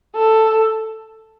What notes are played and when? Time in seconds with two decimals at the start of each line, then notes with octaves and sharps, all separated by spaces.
0.16 A4